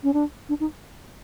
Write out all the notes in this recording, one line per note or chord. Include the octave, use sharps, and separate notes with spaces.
C#4
D4
D4
D#4